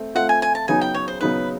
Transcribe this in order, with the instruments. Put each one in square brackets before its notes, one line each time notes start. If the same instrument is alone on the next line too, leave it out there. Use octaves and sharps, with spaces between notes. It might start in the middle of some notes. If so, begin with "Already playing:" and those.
Already playing: [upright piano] A3 C4
[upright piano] A3 C4 F4 [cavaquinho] F#5
[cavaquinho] G#5
G#5
A5
[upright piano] C#3 F#3 B3 D#4 [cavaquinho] G#5
[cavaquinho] G5
C#5
C5
[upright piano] C#3 F#3 B3 D#4 [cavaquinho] B4